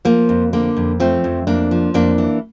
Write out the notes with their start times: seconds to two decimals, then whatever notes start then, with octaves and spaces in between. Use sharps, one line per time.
0.05 F3 A#3
0.29 F2
0.53 D3 A#3
0.77 F2
1.00 F3 A3 C4
1.24 F2
1.47 F2 A#3 D4
1.71 F3
1.94 F2 A#3 D4
2.18 E3